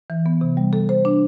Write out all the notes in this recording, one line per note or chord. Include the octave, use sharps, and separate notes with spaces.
E3
B3
C3
G3
A4
C5
D4